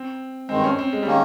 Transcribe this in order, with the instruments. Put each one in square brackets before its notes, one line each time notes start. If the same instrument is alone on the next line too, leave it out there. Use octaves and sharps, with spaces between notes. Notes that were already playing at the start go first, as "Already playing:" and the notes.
Already playing: [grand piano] C4
[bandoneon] G2 D#3 G#3 [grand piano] C4
[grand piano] C#4
C4
G#3
G3
[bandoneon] D#3 A#3 C#4 [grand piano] G#3